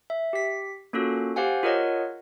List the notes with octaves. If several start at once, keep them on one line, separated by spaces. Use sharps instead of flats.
E5
G4 B6
A#3 C#4 F4 F#4 A4
G4 C5 F5 F#5 G#5
F4 G#4 A#4 C#5 D#5 F#5